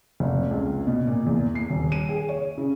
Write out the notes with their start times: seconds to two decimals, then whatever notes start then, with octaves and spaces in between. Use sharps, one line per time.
0.20 F1
0.51 C#2
0.87 B2
1.07 A#2
1.26 E2
1.55 C7
1.70 D#1
1.92 D#7
2.09 G#4
2.29 C#5
2.58 C#3